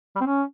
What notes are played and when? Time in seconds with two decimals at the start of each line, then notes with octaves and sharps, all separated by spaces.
0.15 G3
0.21 C4
0.26 C#4